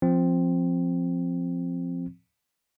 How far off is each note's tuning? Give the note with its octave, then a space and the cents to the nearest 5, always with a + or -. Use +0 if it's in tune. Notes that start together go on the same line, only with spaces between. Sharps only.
F3 +0 C4 +0